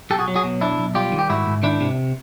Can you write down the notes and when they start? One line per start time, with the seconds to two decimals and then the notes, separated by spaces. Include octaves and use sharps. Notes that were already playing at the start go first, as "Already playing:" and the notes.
0.10 B1 G4 A4
0.19 F#4 G#4
0.28 F#3
0.36 F#4 G#4
0.44 B2
0.61 B1 D4 E4
0.78 B1
0.95 G3 F4 G4
1.12 D#3
1.19 G4
1.29 G#2 E4 F#4
1.47 G#2
1.63 D#3 D4 E4
1.80 C3